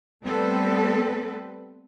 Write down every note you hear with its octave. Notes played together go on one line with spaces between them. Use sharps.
G3 A3 B3 C4 A4 B4